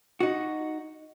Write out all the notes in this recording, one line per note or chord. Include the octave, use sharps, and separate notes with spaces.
D#4 F#4